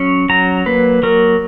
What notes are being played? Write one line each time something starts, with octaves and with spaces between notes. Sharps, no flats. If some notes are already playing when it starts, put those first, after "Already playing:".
Already playing: F#3 C#4
F#3 A#5
A#3 B4
F#3 A#4